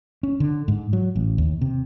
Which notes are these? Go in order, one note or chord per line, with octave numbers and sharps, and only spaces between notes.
C#4
D3
G#2
F#3
A1
D#2
C3